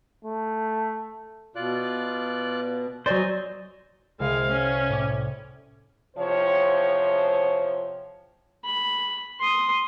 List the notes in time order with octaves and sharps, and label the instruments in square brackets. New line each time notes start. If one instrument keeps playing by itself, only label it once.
[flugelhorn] A3
[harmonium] B2 [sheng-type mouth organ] F4 D5 F#6
[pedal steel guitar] F#3 C5 [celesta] D5 A6 [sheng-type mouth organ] D#5 G#5
[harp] C2 [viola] G#3 F5
[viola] C#4
[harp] A2 D6
[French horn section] E2 C3 F3 C5 C#5
[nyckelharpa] B5
C6 D#6